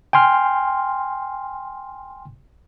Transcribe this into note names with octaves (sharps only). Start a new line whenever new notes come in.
G5 G#5 C6 F6